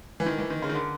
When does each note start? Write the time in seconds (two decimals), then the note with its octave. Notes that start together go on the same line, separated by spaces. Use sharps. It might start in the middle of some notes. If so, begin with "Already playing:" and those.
0.20 E3
0.26 D#3
0.38 E3
0.50 D#3
0.62 C#3
0.69 D#3
0.74 D3